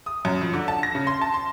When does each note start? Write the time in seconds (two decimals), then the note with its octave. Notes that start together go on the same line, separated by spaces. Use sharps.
0.06 D#6
0.25 F#2
0.41 F2
0.53 D3
0.68 A5
0.83 A#6
0.95 C#3
1.07 C6
1.22 A5
1.34 C6